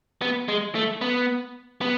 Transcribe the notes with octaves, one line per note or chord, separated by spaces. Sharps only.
B3
G#3
A3
B3
B3